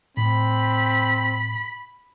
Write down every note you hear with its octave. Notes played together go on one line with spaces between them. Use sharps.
A2 C4 B5